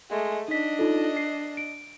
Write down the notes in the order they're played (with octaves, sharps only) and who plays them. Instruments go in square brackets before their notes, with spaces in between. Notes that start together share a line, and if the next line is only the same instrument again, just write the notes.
[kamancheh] G#3 A3
[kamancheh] D4 D#5 [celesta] D#4 B6
[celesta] D#4 F4 A4
C7
D7